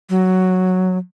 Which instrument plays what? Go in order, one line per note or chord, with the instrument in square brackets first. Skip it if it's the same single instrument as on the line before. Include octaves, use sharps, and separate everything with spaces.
[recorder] F#3